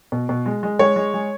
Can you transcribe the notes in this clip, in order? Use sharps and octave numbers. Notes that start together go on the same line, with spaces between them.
B2
B2
G#3
G#3
G#3 C#5
G#3
G#3